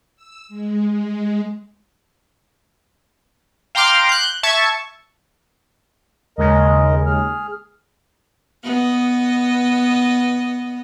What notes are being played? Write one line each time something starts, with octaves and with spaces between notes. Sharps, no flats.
E6
G#3
G#3
F5 G5 A#5 C6 D6 F6
F#6 G6
E5 A5 C#6 G#6
D#2 C#3 G#3 A#4 D#5
G#4 F6
B3 D#5